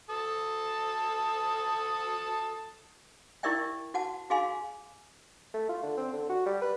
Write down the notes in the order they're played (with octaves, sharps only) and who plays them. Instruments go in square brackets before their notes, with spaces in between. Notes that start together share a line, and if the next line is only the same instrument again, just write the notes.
[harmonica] A4 A5 D#6
[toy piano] E4 G4 A#4 D5 E5 G5
F#4 F#5 A5
F#4 G#4 F5 G#5 C6
[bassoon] A3
F4
D3
C4
D3
F#4
G3
B4